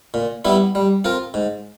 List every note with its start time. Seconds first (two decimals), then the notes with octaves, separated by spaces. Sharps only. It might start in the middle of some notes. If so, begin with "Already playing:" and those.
0.14 A#2
0.45 G3 B3 E4
0.75 G3
1.04 C4 F4 A#4
1.34 G#2